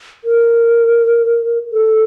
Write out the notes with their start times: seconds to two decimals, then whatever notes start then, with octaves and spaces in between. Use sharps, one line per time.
0.24 A#4
1.72 A4